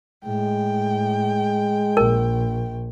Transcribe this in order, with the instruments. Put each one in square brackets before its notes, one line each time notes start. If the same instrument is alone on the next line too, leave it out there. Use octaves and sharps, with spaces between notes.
[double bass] A2 [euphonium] G#3 [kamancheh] G5
[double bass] A#1 [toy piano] A#4